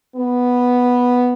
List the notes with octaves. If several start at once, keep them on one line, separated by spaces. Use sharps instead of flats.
B3